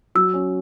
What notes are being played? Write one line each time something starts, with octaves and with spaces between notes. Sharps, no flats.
F#3 E6
C#4